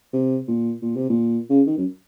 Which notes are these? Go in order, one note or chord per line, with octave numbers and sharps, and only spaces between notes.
C3
A#2
A#2
C3
A#2
C#3
D#3
F#2